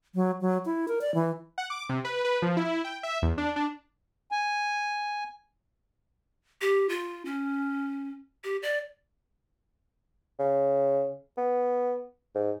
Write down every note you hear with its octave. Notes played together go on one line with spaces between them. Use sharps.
F#3
F#3
E4
A#4
D5
E3
F#5
D6
C3
B4
B4
F3
E4
G5
E5
E2
D4
D4
G#5
G4
F4
C#4
G4
D5
C#3
B3
G#2